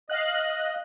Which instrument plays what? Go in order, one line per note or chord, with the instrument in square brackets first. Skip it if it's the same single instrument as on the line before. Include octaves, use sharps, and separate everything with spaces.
[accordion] D#5 [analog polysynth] F5 F#6